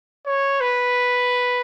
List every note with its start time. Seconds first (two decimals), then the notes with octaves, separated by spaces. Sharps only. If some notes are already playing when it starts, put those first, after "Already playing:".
0.26 C#5
0.61 B4